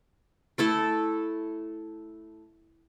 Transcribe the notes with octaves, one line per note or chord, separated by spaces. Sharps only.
A3 E4 A4